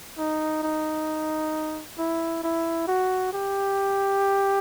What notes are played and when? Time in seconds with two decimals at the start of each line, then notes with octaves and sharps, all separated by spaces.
0.18 D#4
0.63 D#4
1.98 E4
2.43 E4
2.88 F#4
3.33 G4